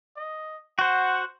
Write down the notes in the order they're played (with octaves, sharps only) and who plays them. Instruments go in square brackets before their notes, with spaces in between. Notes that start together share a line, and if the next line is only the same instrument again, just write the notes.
[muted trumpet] D#5
[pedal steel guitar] F#4 C5 [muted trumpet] F#5